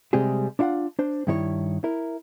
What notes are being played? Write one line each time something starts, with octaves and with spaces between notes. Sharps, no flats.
C3 G3 G#3 C4 G4 G#4
D4 E4 F4 F5 F#5
D4 C5
G2 D#3 E4 A4 C#5
E4 A#4